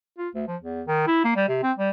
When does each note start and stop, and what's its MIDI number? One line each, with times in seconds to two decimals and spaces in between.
0.18 0.29 65
0.34 0.43 38
0.48 0.56 53
0.62 0.82 40
0.87 1.04 51
1.07 1.21 64
1.24 1.35 58
1.36 1.48 55
1.48 1.61 48
1.63 1.72 60
1.78 1.91 55